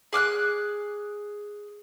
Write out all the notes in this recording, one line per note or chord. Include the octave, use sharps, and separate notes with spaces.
G#4 D6 F6 F#6